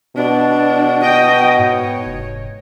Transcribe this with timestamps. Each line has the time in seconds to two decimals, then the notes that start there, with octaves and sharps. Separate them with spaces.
0.16 B2 D4
1.04 D#5 G5
1.58 G#2 C#5
2.05 F1